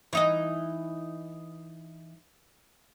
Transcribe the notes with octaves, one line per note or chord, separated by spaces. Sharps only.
E3 D#4 D#5